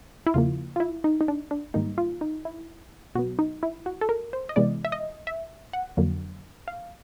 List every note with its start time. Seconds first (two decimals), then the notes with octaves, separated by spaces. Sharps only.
0.27 E4
0.34 E2 C#3 F3 A#3 F4
0.76 F4
0.80 E4
1.04 D#4
1.21 D#4
1.28 D4
1.51 D4
1.74 G#2 D#3 G3 A#3 D#4
1.98 F4
2.21 D#4
2.45 E4
3.15 B2 F#3 B3 F#4
3.39 D#4
3.63 E4
3.86 F#4
4.01 A4
4.09 A#4
4.33 C5
4.49 D#5
4.56 C3 E3 G#3 B3 D5
4.85 E5
4.92 D#5
5.27 E5
5.73 F#5
5.97 F2 D3 F#3 A#3
6.68 F5